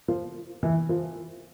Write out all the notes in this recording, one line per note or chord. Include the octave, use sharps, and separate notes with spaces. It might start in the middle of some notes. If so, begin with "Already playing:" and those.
F3 F4
E3 E4
F3 F4